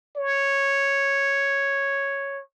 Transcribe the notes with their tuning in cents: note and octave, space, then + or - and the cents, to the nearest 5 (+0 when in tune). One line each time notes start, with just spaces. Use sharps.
C#5 -5